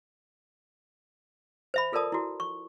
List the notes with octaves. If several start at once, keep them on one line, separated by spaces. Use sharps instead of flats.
C5 E5 B5
F4 A4 A#4 D5 A5 D#6
E4 F#4
C#6